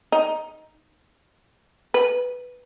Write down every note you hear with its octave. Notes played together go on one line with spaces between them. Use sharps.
D#4
B4